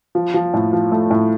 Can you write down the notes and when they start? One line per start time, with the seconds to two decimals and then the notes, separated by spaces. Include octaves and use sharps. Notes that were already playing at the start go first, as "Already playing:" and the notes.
0.15 F3
0.34 F3
0.54 A2
0.73 F3
0.92 A3
1.11 A2